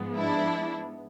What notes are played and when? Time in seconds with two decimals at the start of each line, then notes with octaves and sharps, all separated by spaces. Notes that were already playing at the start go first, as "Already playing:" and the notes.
Already playing: G#2 F3 G#3 B3
0.16 D4 E4